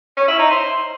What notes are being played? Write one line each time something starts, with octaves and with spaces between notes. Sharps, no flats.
C#4
E4
D#4
C5